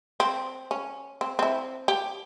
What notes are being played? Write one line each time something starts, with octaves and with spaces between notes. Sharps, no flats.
C4
C#4
C4
C4 E4
G4